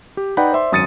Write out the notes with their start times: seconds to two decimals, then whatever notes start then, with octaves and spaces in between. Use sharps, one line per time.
0.17 G4
0.37 D#4 B4 D5 F#5 G5 B5
0.52 C5 D5 E5 C6
0.72 G#1 F#2 D#6 A6 C#7 D#7